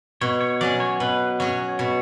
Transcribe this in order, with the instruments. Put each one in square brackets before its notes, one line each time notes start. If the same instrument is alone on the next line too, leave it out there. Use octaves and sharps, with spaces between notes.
[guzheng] B2 [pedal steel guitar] C#5
[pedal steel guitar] C#5
[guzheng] F#3 C#4 G#4 [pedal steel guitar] D5
[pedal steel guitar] C#5
[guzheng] B2 [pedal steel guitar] B4
[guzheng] F#3 C#4 G#4 [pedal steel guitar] C#5
[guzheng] B2 [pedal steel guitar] C#5